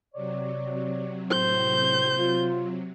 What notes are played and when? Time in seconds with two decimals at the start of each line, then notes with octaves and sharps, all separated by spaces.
0.15 C3 F#3 C#5 D5
1.31 A2 C5 G6
2.18 F4